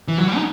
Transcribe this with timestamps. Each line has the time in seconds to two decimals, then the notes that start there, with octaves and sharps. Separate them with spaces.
0.08 E3
0.18 F#3
0.27 G3
0.36 D#4